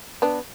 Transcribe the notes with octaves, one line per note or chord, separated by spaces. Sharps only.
B3 D4